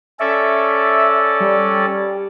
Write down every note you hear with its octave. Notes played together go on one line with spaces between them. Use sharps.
C#4 A4 D5 E5
G3